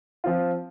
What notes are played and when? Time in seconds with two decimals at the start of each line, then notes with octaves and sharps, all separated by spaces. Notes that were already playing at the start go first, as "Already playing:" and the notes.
0.24 F3 C4 F4